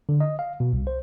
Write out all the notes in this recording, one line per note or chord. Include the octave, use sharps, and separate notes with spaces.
D3
D#5
F5
B2
C2
C5